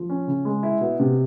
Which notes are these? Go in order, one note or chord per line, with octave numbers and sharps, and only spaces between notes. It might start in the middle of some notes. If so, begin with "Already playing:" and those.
Already playing: F3
C#4
C#3
G#3
E4
B2
C3